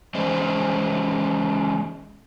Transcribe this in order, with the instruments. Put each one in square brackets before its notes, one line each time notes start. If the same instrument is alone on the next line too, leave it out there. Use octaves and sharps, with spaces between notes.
[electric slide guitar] E3 G#3 C#4 G#4 C5 D#5